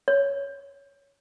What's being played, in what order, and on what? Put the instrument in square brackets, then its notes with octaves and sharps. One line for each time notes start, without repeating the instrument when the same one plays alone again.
[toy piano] C#5